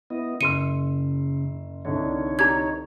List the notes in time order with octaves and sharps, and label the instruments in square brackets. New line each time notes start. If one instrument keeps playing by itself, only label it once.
[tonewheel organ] B3 E4 D#5
[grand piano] F#1 C6 E6 [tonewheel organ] C#3 [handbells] C#7 [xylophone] D#7
[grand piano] C2 D3 [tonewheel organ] D#4 C#5
[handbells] D4 G4 A#5 [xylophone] G#6